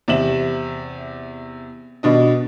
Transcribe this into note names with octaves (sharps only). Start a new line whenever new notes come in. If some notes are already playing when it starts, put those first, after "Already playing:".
E2 C3 E5 E7 F#7
B2 D4 D#5